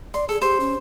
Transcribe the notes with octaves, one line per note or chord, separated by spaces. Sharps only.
D5 C6
G#4 A4
G4 C5
C#4